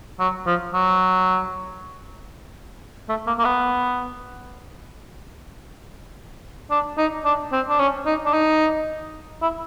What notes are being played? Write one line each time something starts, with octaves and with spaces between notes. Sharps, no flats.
F#3
F3
F#3
A3
A#3
A#3
B3
D4
D#4
D4
C4
D4
C#4
D#4
D4
D#4
E4